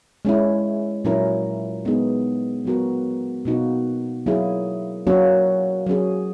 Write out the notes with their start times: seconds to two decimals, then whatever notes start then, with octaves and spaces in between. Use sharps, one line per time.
0.25 G#3 C#4 E4
1.05 A#2 F#3 C#4 E4 A#4
1.85 G#3 B3 D#4 G#4
2.65 F#3 B3 F#4 A#4
3.45 B2 A#3 D#4 F#4
4.26 F#3 A#3 E4 G#4
5.07 F#3 A#3 C#4 F#4
5.87 F#3 C#4 G#4